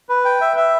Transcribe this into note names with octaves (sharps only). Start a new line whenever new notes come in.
B4
G5
E5
E5